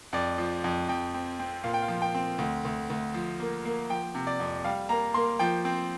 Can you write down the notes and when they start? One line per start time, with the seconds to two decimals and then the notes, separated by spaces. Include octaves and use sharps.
0.13 F2 D5
0.38 F3
0.64 F2
0.89 F2 G5
1.14 C4
1.39 C4
1.64 A#2 F5
1.74 G5
1.82 F5
1.88 F3
2.02 G5
2.15 C4
2.38 D2
2.65 D2
2.90 D2
3.14 F3
3.40 A#3
3.65 A#3
3.90 F3 G5
4.15 C3
4.27 D5
4.40 F2
4.64 G3 F5
4.89 A#3 A#5
5.14 A#3 C6
5.39 F3 G5
5.65 C4